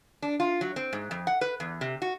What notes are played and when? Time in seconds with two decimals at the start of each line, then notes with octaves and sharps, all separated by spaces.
0.22 D4
0.40 F4
0.61 F#3
0.76 C4
0.93 G#2
1.11 F2
1.27 F#5
1.41 B4
1.60 E2
1.81 C3
2.02 F#4